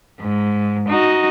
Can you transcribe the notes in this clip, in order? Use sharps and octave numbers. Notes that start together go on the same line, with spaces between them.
G#2
D#4 F#4